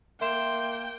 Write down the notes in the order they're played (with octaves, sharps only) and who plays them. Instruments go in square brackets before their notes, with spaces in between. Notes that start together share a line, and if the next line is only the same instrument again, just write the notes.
[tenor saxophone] A#3 [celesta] E5 C6 E7 [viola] G5